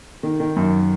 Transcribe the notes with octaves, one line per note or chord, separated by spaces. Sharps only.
D#3
D#3
F#2